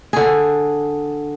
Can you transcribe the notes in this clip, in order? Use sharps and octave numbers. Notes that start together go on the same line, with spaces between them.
D3 G#4